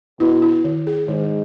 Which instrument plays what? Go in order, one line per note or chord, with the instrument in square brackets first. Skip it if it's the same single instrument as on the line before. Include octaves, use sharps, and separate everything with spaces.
[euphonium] B2 [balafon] E4
[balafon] E4
D#3
G#4
[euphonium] G#2 [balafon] D#3